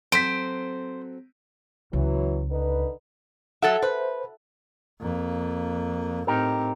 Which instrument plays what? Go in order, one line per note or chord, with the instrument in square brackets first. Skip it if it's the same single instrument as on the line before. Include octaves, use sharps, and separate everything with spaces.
[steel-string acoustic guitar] F#3 C4 A4 [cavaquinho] C5 [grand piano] B6 D7
[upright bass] C#2 [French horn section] E3 F#3
[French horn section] D3 D#4 B4
[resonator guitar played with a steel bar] F#3 A4 E5 [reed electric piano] F#5 A6
[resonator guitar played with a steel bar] B4 [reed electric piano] C5
[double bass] F2 A#3
[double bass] A2 C4 [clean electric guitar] D#4 G4 A#4